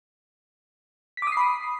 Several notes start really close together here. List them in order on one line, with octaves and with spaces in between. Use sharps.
B6 D6 D#6 C7 B5